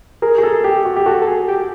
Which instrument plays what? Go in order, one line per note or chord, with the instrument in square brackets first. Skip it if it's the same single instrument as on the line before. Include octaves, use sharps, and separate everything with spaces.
[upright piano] G#4 [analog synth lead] A#4
[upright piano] G#4
A4
G4
F#4
G4
[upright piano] F#4 [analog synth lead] A4
[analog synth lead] A4
G#4
G4